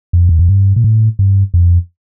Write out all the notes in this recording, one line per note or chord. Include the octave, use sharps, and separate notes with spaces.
F2
E2
F2
G2
A#2
A2
G2
F2